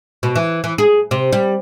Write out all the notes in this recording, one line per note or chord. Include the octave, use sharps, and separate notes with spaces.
B2
E3
E3
G#4
C3
G3